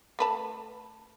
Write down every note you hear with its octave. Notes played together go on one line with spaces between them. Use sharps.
A3 B4 A5